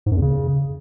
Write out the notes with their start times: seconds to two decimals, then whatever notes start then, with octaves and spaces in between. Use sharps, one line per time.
0.06 G#2
0.11 F#2
0.17 E2
0.22 C#3